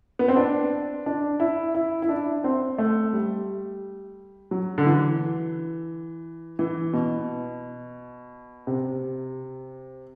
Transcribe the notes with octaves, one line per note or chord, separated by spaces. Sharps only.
B3
C4
D4
D4
E4
E4
E4
D4
C4
A3
G3
F#3
D3
E3
E3
B2
C3